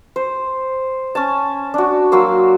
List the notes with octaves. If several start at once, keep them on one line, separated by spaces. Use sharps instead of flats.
C5
C#4 G#5 A5
D4 F#4
F#3 A#3 C6 E6